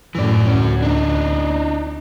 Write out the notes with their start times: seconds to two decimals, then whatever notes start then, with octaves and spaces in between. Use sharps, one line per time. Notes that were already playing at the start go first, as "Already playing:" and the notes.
0.15 F#2 A2 E3 D5
0.47 D2 C#4 F#4
0.82 D4 D#4